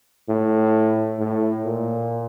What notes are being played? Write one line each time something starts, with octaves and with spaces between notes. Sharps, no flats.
A2
A2
A#2